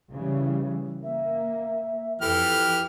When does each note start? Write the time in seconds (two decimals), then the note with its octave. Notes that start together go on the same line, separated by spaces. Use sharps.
0.14 C#3 E3 G3
1.03 A#3 E5
2.21 F2 E3 G4 A4 F6